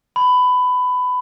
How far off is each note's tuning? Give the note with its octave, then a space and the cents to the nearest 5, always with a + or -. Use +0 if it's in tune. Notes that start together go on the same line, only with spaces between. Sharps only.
B5 +20